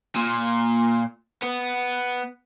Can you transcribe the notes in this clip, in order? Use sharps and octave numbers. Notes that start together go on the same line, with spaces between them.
A#2
B3